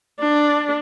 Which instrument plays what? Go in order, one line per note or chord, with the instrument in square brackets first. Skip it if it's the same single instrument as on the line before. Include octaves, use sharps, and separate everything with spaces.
[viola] D4